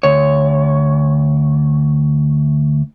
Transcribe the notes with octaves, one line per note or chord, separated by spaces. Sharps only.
D2 C#5